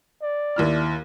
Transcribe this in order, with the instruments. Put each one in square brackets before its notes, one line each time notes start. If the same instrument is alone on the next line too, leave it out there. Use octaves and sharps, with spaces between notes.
[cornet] D5
[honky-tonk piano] D#2 E4 F6